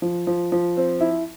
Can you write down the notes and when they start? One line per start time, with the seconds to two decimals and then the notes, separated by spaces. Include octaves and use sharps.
0.02 F3
0.27 F3
0.52 F3
0.77 C4
1.01 E4